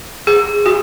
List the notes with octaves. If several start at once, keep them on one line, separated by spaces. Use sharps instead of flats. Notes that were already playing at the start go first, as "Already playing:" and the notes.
G#4
F#4